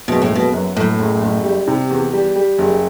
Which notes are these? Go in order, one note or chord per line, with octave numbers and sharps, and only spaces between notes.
F#1 B2
A2
F#1 B2
F#2
F#2 A2
F#1
F#1
G3
C3
E2
G3
G3
F#1